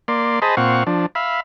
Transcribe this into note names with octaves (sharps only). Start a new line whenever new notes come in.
A#3 D5 C6
G#4 C5 D#5 A5 B5
A#2 C4 F5 F#5 C#6
F3 D4
E5 F5 B5